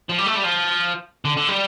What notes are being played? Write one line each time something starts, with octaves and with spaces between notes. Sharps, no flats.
F3
G3
A3
G3
F3
D3
D3
G3